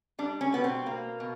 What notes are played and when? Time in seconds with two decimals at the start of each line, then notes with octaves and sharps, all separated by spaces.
0.19 G3 D4
0.41 C#4
0.52 B2 B3
0.64 C4
0.86 A#3
1.20 B2